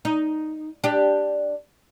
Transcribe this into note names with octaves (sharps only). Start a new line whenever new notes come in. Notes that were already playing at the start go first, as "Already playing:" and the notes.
D#4
D4 G4